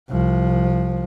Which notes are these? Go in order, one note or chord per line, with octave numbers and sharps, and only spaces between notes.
C2 F3